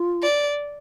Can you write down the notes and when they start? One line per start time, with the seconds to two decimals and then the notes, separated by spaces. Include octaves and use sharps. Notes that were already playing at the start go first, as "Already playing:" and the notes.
Already playing: F4
0.22 D5